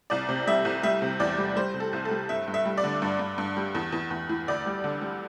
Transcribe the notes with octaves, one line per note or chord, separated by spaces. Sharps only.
C2 D5
C3
G3 E5
C2
G3 E5
C3
E2 D5
G3
G3 C5
C3
A4
C2
A4
G3
G2 E5
G2
E5
G3
D5
D3
G2
G2
G2
G3
E2
E2
E2
E3
D2 D5
G3
D3
G3